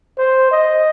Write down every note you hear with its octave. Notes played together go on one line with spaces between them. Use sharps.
C5
D#5